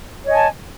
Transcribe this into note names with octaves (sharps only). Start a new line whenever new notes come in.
C#5 D#5 G#5 A5